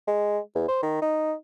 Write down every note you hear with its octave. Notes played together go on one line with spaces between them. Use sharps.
G#3
E2
C5
D#3
D#4